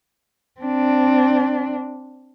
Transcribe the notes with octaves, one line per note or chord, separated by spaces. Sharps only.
C4 D4